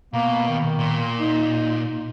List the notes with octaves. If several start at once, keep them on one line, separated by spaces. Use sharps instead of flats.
B2 A#3
D#3
A#2
D#4